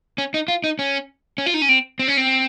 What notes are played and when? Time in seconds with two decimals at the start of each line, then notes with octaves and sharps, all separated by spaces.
0.18 C#4
0.34 D#4
0.48 F4
0.64 D#4
0.79 C#4
1.38 C#4
1.46 F4
1.54 D#4
1.62 C#4
1.69 C4
1.99 C4
2.08 C#4
2.17 C4